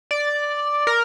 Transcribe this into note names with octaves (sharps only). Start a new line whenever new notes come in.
D5
A#4